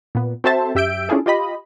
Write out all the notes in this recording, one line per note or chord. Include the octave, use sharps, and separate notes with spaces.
A#2 B3
C4 F#4 A4 C5 E5 A5
F#2 G4 E5 E6 G6 D7
C#4 D4 E4 F4 G#4 A4
F4 G4 D#5 B5